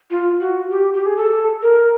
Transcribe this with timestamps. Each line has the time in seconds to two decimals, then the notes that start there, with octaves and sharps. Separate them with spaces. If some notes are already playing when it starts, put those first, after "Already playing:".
0.10 F4
0.40 F#4
0.70 G4
0.93 G4
1.06 G#4
1.17 A4
1.62 A#4